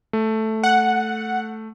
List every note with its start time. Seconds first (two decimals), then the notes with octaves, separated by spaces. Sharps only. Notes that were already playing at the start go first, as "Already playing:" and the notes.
0.13 A3
0.64 F#5